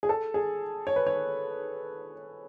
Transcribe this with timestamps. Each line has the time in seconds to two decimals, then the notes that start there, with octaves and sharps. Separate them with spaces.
0.03 G#4
0.09 A4
0.34 G#4
0.87 C#5
0.96 B4
1.07 C#5